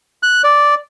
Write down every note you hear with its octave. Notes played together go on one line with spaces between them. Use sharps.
F#6
D5